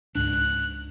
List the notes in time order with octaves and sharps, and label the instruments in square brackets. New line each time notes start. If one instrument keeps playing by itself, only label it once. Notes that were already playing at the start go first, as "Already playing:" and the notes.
[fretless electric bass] C#2 G#2 D4 [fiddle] F#6